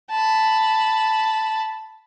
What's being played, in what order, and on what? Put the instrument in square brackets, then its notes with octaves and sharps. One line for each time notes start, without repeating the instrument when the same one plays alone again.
[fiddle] A5 B5